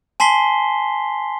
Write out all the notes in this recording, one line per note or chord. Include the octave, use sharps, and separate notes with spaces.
G#5 A5 C6 B6 C7 G7